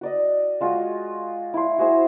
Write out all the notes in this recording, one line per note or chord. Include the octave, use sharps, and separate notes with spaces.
F#4 D5 D#5
G#3 F4 F#4
E4 C6
F#4 G#4 C5 E5